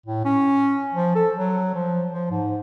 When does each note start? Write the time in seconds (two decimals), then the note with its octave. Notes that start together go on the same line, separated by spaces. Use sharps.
0.06 A2
0.25 C#4
0.94 F3
1.15 A4
1.37 F#3
1.75 F3
2.12 F3
2.31 G#2